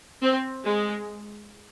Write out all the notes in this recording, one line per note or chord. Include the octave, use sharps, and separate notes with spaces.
C4
G#3